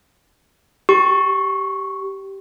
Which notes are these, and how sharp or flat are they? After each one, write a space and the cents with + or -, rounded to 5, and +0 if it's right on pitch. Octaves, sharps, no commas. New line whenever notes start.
G4 -10 C#6 +0